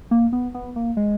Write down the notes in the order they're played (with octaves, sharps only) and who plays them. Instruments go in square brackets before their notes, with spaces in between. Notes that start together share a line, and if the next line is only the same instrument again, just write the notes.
[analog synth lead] A#3
B3
B3
A#3
G#3